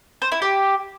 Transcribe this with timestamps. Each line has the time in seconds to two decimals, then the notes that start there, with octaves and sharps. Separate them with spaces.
0.22 C5
0.32 E4
0.42 G4